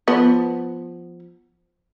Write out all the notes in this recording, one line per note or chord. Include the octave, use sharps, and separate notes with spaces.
F3 B3